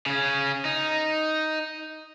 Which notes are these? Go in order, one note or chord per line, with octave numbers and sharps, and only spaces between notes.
C#3 C#4
D#4